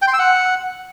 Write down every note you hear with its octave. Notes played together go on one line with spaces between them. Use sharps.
G5
C6
E6
F#5